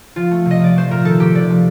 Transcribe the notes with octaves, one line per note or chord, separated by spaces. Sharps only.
F3 F4
A3
C3
D#5
F3 D5
A3 C5
A#2 A#4
D#3 A4
A3 G4
C3 D5
F3